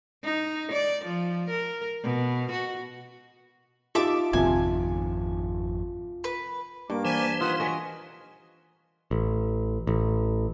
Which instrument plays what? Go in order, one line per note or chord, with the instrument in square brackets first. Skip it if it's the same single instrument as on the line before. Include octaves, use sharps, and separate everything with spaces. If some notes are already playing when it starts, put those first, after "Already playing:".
[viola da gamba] D#4
D5
F3
A#4
B2
F#4
[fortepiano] D#4 G4 [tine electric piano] F4 [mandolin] E5 A5 D6
[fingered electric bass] G#1 F2 D#3 [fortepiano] C3 F3 [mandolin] G#5
[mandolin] B4
[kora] G2 [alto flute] A#3 [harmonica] D6
[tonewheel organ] E3 C5 [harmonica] D5 G#5 A5
[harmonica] D#3 F#5 D#6 [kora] F4 [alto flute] B4
[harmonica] F#4 C#6 [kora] A#4 D#5 [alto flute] G#5
[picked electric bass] A1
A1